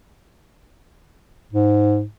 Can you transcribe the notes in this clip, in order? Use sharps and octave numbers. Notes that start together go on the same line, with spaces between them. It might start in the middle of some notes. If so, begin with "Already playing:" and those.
G#2